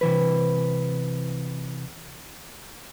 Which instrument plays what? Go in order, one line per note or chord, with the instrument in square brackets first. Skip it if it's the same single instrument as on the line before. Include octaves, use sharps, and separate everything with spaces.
[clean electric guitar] C3 E3 B4